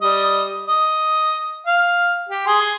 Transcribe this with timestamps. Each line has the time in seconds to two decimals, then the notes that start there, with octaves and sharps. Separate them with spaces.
0.02 G3 D#5
0.67 D#5
1.67 F5
2.29 G4
2.47 G#4 C6